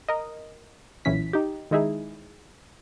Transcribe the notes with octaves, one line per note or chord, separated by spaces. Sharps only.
A#4 D#5
B1 A#2 E3 C#4 B6
D#4 G4
D#3 G#3 D#4 E4 G#4